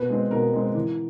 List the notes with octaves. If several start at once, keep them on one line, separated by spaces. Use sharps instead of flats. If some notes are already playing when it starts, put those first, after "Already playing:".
Already playing: B2 B4
G#3 C4
B2 A#4
G#3 C4
E3